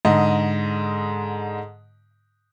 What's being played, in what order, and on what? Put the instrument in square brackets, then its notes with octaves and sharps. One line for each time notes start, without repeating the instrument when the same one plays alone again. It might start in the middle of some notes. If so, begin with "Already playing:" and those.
[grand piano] G#2 D3 D#5